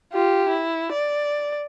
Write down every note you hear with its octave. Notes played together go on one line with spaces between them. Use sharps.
F4 G4
E4
D5